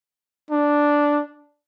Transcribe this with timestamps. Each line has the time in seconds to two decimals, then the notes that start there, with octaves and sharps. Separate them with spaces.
0.50 D4